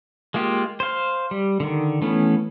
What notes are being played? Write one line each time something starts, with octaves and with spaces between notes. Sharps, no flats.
G#3 A#3 F4 G4
C5 F5
G3
D3 D#3
E3 A3 B3 C#4